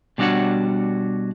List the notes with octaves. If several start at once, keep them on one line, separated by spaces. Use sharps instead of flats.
B2 G3 D4 F#4 C#5 F#5